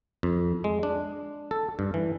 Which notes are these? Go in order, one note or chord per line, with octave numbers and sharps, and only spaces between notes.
F2
G#3
D4
A4
G2
E3